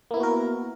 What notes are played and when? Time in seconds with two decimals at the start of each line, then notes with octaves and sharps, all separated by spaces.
0.11 A#3
0.14 E4
0.17 B3
0.20 F#4
0.23 A#4